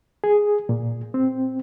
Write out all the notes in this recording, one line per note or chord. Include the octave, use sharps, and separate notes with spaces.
G#4
A#2
C4